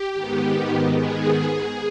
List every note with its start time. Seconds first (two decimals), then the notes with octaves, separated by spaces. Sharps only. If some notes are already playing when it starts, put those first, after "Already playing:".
Already playing: G4
0.13 G#2 D#3 B3
0.92 G#4